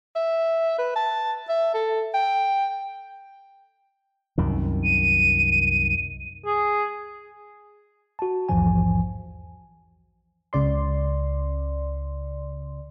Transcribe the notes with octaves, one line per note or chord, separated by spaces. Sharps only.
E5
B4
A5
E5
A4
G5
C2 F#2 D#3
D#7
G#4
F#4 A5
A#1 E2 G#2 E3 F3 G#5
C#2 C#3 D5 C6